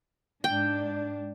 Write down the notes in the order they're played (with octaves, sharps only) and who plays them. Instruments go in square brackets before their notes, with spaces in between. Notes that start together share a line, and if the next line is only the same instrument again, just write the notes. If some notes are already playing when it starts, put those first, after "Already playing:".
[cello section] G#2 D4 [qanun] G5